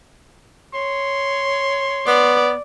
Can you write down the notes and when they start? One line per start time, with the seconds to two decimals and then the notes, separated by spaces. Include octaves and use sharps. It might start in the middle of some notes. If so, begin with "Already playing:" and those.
0.74 C#5 C6
2.07 B3 D5